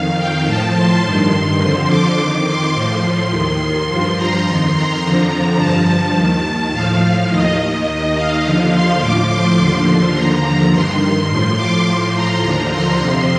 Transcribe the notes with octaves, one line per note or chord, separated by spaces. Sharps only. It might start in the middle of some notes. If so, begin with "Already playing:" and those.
Already playing: F2 D#3 F5
G5
A2 F3 A5
C6
G2 D#3
C6
F2 D3 F3 C6
D6
F2 D#3
C6
A2 F3
C6
D#2 D#3
C6
G2 F3
A#5
F2 D#3 C6
A#5
F2 D3 F3
G2 F3 A5
D#2 D#3
A2 F3 F5
D#2 D#3 D#5
D#2 D#3
F5
D#2 D3 F3
C6
A2 F3 D6
C6
D#2 D3 F3
D#2 D3 F3 A#5
A#5
G2 D#3 C6
A2 F3 C6
D6
A2 F3 C6
A#5
D#2 D3 F3
C6
F2 C3 F3